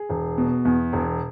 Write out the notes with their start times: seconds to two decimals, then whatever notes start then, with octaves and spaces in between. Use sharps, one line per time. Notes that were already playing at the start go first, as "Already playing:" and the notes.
Already playing: G#4
0.09 E1
0.38 B2
0.65 E2
0.93 E1